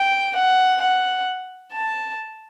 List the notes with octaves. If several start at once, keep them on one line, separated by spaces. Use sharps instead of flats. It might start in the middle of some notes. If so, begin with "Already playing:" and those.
Already playing: G5
F#5
F#5
A5